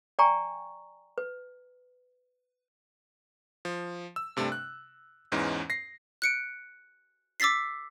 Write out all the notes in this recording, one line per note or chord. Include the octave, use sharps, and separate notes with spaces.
D5 G5 G#5 A#5 C#6
B4
F3
E6
G2 C3 A3 D4
F#6
E2 G#2 E3 G#3 C#4
A#6 C7
F#6 C#7 D7
D6 E6 A6 B6 C7